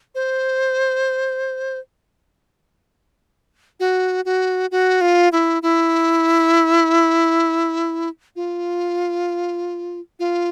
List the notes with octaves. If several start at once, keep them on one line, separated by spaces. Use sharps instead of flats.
C5
F#4
F#4
F#4
F4
E4
E4
F4
F4